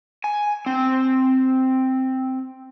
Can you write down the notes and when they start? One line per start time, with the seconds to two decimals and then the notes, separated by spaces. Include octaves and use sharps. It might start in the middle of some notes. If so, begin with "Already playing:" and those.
0.24 G#5
0.66 C4